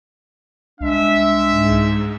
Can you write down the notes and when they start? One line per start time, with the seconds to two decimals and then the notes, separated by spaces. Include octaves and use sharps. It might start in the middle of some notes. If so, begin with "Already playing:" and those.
0.81 C2 G#3 D4 E5
1.50 G#2